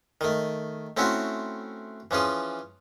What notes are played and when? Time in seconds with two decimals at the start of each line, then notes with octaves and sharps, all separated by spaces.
0.21 D#3 A3
0.97 A3 C4 C#4 E4 F#4
2.11 E3 F3 C#4 G#4